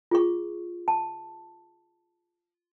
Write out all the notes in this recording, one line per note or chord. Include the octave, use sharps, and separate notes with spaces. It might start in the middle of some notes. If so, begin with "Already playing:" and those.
F4 G#4 C#6
A5